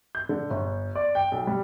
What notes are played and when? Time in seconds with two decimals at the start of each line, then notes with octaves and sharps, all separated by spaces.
0.15 G6
0.29 D3
0.50 G1
0.95 D5
1.15 G5
1.32 B1
1.47 G3